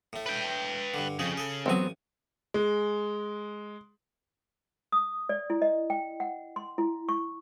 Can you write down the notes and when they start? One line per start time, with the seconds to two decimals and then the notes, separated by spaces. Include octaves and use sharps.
0.13 A2 A3
0.26 B4 G5
0.94 G2 D3
1.19 F2 C#3 G#4
1.37 G#4 A4
1.66 A1 F#3 B3 C4 G#5
2.54 G#3
4.92 D#6
5.29 D5
5.50 E4
5.62 D#5
5.90 G5
6.20 F#5
6.56 C6
6.78 E4
7.09 C#6